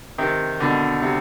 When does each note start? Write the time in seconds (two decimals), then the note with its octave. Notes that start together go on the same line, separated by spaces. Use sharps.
0.18 C3 D#3
0.60 B2 D3
1.02 C3